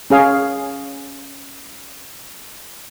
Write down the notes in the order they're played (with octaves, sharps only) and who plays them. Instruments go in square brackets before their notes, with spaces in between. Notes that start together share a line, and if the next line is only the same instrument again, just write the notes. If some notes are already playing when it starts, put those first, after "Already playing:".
[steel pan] C#4 G#4 F5